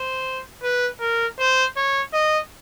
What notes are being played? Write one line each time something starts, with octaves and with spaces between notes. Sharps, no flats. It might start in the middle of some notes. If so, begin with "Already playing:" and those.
Already playing: C5
B4
A#4
C5
C#5
D#5